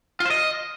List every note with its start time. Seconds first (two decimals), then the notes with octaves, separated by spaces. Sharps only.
0.20 F4
0.25 C5
0.30 D#5